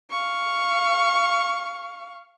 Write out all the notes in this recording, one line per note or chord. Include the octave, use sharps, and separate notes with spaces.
F5 C#6